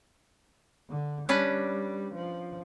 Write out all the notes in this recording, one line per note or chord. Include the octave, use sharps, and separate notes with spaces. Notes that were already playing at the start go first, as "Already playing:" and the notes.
D3
G3 C#4 D4 B4
F3